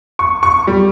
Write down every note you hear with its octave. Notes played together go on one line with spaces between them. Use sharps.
C#6
C#6
G3